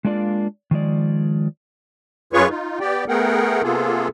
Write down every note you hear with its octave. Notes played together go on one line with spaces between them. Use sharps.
G#3 A#3 D4 F4 D5 F5
D#3 F3 G#3 D5
F#2 F4 G#4 B4 C#5 C#6
D#4 F4
B3 G4 D5 G5
A3 B3 G#4 A#4 F#5 G5
C3 A#3 B3 F4 G#4 A4